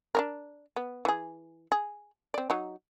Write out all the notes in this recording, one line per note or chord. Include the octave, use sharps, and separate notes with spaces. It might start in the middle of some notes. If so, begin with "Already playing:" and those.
D4 D#4 A#4
B3
E3 G#4
G#4
C4 D5
F#3 D#4